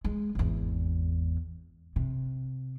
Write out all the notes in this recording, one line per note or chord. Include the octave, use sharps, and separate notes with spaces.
G#3
G#1 E2
C3